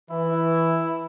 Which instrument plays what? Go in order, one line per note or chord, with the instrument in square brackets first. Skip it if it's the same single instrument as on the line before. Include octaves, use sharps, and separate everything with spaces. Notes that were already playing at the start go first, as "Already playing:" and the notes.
[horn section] E3 [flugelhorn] E4